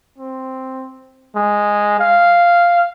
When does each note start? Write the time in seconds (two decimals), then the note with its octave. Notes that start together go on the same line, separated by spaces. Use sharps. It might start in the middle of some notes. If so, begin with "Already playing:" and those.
0.18 C4
1.35 G#3
2.00 F5